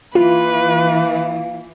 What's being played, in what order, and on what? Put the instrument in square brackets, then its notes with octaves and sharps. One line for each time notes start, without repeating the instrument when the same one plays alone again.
[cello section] E3 [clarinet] A#3 [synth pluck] F4 [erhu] B4